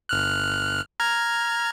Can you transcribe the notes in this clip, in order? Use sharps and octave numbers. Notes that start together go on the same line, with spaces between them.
G1 F6 F#6
A#5 F6 G#6